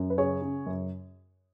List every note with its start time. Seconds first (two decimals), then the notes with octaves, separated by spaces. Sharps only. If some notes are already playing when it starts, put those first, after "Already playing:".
Already playing: F#2
0.10 B4
0.18 C#3 G#4 C#5
0.42 C#3
0.66 F#2